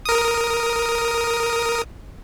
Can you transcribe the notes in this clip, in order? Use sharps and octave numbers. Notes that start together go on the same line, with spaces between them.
A#4 D#6